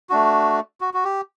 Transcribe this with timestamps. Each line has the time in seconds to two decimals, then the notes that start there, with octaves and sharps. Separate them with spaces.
0.10 A3 D4 F#4
0.81 F#4
0.94 F#4
1.05 G4